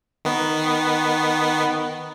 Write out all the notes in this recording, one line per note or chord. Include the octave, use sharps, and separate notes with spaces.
D#3 B3